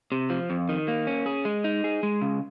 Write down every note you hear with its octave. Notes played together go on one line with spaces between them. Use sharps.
C3
F3
F2
D#3
A#3
C#4
G#4
G#3
D#4
G#4
G#3
C#3